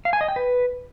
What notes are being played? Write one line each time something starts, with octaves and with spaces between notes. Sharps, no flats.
F5
G#5
D#5
G5
B4